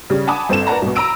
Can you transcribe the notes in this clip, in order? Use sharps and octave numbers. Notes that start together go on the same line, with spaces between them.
C#3 G3
F#5 G#5 A5 B5 D6 D#6
G1 C4 A4 E7
A#4 B4 D5 F#5 A5 A#5
C2 B2
A#5 B5 E6 D7 D#7